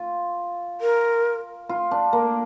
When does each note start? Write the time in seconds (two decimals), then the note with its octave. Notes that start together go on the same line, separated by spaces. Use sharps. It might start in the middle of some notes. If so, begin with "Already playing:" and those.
Already playing: F4
0.81 A#4
1.69 F4
1.91 D4
2.13 A#3